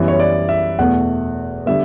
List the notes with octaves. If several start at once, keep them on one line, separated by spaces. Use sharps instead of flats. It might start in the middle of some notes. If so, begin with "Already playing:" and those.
Already playing: F#2 E3 G3 B3
C#5
D5
E5
E2 B2 A3 F#5
D3 G3 B3 E5